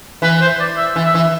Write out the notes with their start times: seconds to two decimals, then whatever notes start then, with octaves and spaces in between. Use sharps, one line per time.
0.22 E3 B4
0.41 C5
0.59 D5
0.77 E5
0.96 E3
1.05 E5
1.14 E3